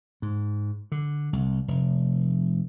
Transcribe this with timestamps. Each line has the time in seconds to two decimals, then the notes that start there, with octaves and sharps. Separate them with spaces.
0.22 G#2
0.92 D3
1.33 C2
1.68 F1